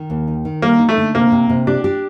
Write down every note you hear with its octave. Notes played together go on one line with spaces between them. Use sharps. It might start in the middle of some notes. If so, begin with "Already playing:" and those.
Already playing: D#3
D#2
D#4
D#3
G3 A#3
D#4
A3
D3
C3 A#3
C3
C3
D4 G4
G4